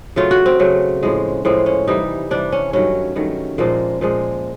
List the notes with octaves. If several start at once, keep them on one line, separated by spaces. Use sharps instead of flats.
C#3 F#3 A3 F4
F#4
C4
C#3 F#3 A3
A2 F3 G#3
A2 F3 G#3 C4
C#4
C3 E3 G3 D#4
C3 E3 G3 D4
C#4
G2 D#3 F#3 A3 C#4
G2 D#3 F#3 A3
A#2 F3 G#3 A#3
A#2 F3 G#3